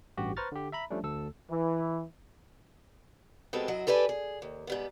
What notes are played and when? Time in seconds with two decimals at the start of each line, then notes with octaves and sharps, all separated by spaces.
0.17 A1 G2 F#4 G4
0.37 B4 C5 A#5 C#6 F6 A6
0.52 D3 G4
0.72 E5 A#5 B5
0.90 F3 G3 A3 C#4 D4
1.03 D2 A4 E6
1.49 E3
3.53 B2 G3 G#3 B3 C4 A4
3.68 F#2 F#3 E4 D#5
3.87 G4 A4 B4 D5 G#5
4.09 G#4
4.42 D#2
4.67 G#2 G3 B3